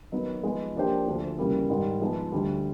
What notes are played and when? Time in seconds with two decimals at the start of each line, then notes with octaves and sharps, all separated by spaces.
0.12 D#3 F#3 B3 D#4
0.43 F3 G#3 B3 D#4
0.75 F3 A#3 D4 G4 C5
1.06 D2 D3 F3
1.38 E2 C#3 E3 G3 A#3
1.69 G#2 D#3 G3
2.01 F3 G#3 B3 D#4
2.32 D2 D3 G3